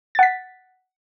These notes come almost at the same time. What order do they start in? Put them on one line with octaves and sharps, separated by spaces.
A6 F#5 B6